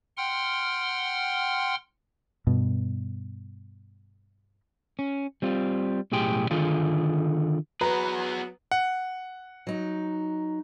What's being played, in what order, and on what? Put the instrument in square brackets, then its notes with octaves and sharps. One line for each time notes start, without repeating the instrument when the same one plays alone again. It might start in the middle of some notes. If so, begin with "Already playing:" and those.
[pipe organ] F#5 G5 C6 F6
[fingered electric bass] G2 B2
[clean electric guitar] C#4
G3 C4 F4
B1 A2 G4 G#4 G5 C6
D3 D#3 F4 G#4 A4 F5
[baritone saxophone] F#3 [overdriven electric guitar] B3 G#4 [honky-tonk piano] B4 [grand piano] A#5
[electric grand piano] F#5
[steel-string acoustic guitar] F#3 D#4